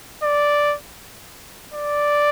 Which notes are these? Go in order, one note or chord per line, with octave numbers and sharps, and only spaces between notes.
D5
D5